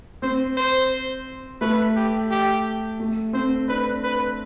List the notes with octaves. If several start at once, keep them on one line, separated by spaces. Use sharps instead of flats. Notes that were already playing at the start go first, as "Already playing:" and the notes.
C4 C5
C5
A3 B4
G4
G4
A3
C4 C5
D4 B4
B4